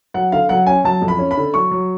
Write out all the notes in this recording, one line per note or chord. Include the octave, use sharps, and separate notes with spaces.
F#3 F#5
D3 F5
F#3 F#5
C#4 G#5
F#3 A5
F2
B5
C#4
B5
D3
F#3 C#6
F#3